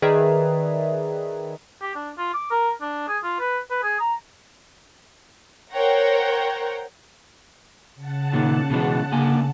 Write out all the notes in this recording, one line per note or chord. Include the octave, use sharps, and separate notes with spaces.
D#3 G#4 B4 D5 E5 A#5
G4
D4
F4
D6
A#4
D4
G#4
F4
B4
B4
G#4
A#5
A#4 C5 C#5 F#5 G5 A#5
C#3 F#5 A5
A#2 D#3
B2 E3 G#3
D3 A#3 G#5